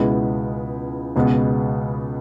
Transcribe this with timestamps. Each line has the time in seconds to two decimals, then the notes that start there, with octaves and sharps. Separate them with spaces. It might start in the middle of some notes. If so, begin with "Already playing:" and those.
Already playing: C#2 B2 G#3 B3 E4
1.16 C#2 B2 G#3 B3